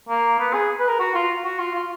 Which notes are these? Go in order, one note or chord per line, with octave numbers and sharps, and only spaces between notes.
A#3
B3
G#4
B4
A#4
F#4
F4
F#4
F4
F4